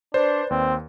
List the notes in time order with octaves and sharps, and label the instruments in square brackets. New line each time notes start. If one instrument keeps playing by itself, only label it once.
[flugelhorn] D4 [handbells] B4 D5 [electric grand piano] C5
[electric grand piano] D#2 [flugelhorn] C4